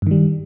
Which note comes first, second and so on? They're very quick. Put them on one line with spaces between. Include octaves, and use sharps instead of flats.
G2 D#3 G3